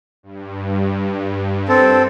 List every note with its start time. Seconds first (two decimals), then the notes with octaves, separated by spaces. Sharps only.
0.23 G2
1.68 C4 A4